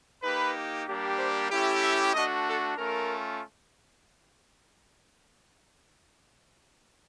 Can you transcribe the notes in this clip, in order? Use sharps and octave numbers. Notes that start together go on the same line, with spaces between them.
A#3 D#4 G4 B4
G3 A#3 D4 G4
C5
A3 C#4 E4 G4
E5
A3 D4 F#4 D#5
A4
A3 C#4 F4 A#4